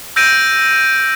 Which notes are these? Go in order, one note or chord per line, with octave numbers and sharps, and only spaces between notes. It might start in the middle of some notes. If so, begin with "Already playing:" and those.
E6 G6 A#6 D7 D#7